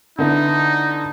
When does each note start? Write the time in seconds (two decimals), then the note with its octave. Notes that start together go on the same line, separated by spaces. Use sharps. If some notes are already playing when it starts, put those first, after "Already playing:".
0.19 D3 B3 D#4 E4